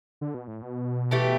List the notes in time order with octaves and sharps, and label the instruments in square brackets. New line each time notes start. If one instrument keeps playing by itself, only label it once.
[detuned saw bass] D3
B2
A2
B2
[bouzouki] E3 A3 G4